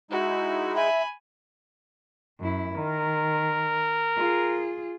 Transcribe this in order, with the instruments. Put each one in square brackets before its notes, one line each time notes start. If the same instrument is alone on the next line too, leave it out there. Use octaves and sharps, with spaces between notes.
[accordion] G#3 D#4 E4 [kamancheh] F#4
[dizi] E5 [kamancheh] G#5 B5
[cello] F#2 E4
[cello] D#3 [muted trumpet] A#4
[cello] F4 G#4